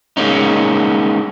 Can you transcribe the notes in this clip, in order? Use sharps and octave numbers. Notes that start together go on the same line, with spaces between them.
G#3 A#3 C#4 D#4